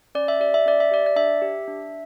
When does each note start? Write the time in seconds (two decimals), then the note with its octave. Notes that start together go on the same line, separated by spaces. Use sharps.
0.15 C#4 D5
0.28 E5
0.40 G4 D5
0.54 E5
0.66 C#4 D5
0.80 E5
0.91 G4 D5
1.06 D5
1.16 D4 E5
1.42 G4
1.68 D4